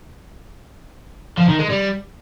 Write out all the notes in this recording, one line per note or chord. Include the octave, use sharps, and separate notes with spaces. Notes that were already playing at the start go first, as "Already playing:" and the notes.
F3
D#3
G#3
G3